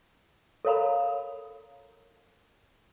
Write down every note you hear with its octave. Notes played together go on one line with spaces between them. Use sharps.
A4 A#4 C#5 F5 A#5 B5